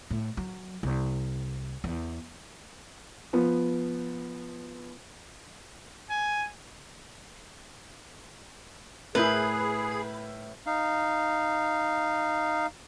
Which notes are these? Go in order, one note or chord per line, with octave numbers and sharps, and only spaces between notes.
A2
F#3
C2
E2
F3 B3
G#5
A2 E4 G#4 A#4 B4 G6
D#4 F5